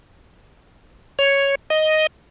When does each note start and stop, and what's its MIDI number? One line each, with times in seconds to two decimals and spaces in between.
1.19 1.55 73
1.70 2.07 75